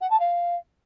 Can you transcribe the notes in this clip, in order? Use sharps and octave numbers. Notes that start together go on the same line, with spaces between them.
F#5
A5
F5